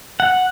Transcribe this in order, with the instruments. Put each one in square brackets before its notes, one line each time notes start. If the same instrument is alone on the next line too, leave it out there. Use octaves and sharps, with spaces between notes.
[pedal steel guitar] F#5